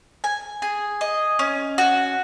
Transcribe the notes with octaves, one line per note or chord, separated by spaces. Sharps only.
G#5
G#4
D#5
C#4
F#4